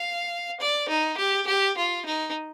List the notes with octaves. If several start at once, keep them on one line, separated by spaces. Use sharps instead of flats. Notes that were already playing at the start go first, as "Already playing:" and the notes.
Already playing: F5
D5
D#4
G4
G4
F4
D#4